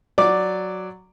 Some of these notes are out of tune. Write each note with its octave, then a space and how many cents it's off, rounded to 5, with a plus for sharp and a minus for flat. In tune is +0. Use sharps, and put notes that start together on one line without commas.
F#3 +0 D5 +0 D6 +0